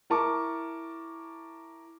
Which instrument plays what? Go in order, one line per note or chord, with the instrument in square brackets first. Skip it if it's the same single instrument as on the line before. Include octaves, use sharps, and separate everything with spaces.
[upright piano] E4 A#4 A5 C#6 D6